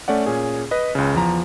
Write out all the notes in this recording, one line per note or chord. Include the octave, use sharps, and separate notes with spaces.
A3 C#4 D5 F#5
A#2 C#4 G#4
B4 D#5
C#2 C#3
E2 F3 A#5